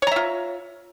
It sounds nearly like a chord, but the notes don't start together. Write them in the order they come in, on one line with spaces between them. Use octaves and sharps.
C#5 A#5 E5 F4